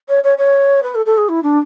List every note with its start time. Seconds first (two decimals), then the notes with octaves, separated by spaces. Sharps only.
0.09 C#5
0.24 C#5
0.38 C#5
0.83 B4
0.95 A4
1.06 A4
1.18 G#4
1.29 E4
1.43 D4